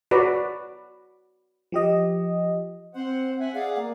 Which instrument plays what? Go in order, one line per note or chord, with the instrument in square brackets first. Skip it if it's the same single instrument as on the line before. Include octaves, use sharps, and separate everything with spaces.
[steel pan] F#4 B4 D5
[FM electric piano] F3 G4 D#5
[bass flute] C4 [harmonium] C5 F#5
[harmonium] E5 F#5 G#5
[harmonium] G#4 D5 F5 [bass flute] F#5
[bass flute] A#3